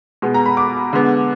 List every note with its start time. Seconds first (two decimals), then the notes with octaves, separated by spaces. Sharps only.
0.22 B2 G#3 B3
0.34 A#5
0.46 B5
0.57 D6
0.93 D3 G#3 B3